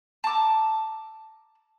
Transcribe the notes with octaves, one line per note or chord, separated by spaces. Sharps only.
A5 A#5 D6 E6